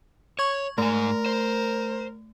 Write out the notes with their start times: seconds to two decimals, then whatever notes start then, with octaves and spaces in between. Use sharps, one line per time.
0.39 C#5 C#6 G#6
0.78 G#2 A3 A#4 G#5
1.26 C5